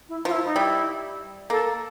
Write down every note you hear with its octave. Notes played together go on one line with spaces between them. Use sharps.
E4
F3 F4
E4
D#4
G3 E4
A#3 A4